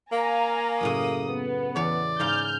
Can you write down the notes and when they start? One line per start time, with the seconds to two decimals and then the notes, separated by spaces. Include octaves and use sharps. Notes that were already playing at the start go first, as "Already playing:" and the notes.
0.12 A#3 F5 G#5 A#5
0.81 F#2 A2 C#3 D#6
1.29 B3
1.76 E2 C#5 D5
2.20 G#2 C#3 F5 F6 G6